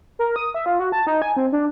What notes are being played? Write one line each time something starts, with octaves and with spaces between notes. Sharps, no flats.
A#4
D#6
E5
F4
F#4
A5
D#4
G#5
C4
D4